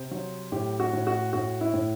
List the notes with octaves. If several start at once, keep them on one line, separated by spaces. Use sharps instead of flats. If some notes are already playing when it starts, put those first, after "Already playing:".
Already playing: C3 C5
F#3
A2 G4
F#4
A2
F#4
A2 F#4
E4
A2